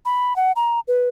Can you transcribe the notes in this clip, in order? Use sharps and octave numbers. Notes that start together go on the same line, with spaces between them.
B5
F#5
A#5
B4